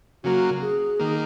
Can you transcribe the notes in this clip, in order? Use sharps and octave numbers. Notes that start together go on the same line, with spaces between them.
C#3 F#3 A#3 F#4
G#4
D#3 A#3